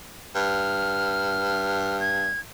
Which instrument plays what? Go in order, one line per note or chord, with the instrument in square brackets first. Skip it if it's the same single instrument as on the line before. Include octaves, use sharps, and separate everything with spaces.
[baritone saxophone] G2 [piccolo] F6
[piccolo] G#6